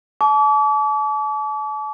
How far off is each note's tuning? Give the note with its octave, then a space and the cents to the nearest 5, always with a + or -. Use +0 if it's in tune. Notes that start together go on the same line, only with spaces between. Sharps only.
A5 -40 D6 -40